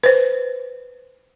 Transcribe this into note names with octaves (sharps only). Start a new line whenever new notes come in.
B4 C5